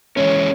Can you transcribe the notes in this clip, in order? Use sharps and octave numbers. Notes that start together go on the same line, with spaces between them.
E3 G#3 C#4 C#5